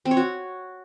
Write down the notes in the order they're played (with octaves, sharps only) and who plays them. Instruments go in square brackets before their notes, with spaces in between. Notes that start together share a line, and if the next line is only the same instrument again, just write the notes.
[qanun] C4
C#5
F#4